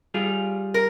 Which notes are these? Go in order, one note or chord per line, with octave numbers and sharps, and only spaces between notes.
G3 F4 G#4
A#4